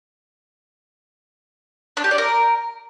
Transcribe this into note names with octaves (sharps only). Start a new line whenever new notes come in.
D4
G4
D5
A#4